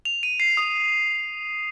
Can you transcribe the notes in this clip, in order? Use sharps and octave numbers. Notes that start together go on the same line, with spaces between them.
F7
D#7
C7
D#6